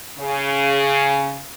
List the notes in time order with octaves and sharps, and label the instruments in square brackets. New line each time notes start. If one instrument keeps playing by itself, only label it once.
[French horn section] C#3